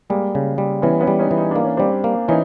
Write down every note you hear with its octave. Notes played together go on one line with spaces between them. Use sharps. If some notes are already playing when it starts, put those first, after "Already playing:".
G3 G#3 A#3
C#3
G3
E3 B3 C#4
B3 C#4
G3
C#4 D#4
E3
D#4
A#3 D4
C#4
G3 C4 D4
A#3
E3 C#4 D#4